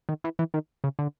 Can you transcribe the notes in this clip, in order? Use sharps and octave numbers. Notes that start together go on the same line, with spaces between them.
D#3
E3
E3
D#3
C#3
D3